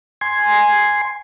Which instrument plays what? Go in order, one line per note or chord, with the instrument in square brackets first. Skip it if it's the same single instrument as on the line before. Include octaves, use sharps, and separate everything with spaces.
[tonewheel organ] G#5 C6